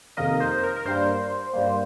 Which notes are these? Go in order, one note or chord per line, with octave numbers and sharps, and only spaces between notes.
F2 C3 D#3 A#3 A#4 D#5
C5
A#4
A#4
G2 G3 A#3 C5
G2 G3 A#3